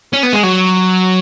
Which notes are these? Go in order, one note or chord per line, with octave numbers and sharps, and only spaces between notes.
C#4
B3
G#3
F#3